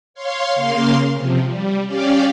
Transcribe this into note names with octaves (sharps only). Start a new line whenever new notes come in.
C#5 F5 C6
C#3 A#3 F5 C6
C3 F3
G3
C#4 G4 D5 F5